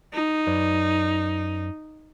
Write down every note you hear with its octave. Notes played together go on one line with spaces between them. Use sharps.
D#4
F#2 B4 D5